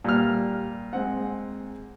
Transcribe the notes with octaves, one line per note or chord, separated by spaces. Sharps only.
A#2 G3 F6
G#3 C4 F#5